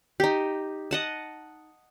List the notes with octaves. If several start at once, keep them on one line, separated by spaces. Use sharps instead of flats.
D#4 G4
D#5 F#5 A5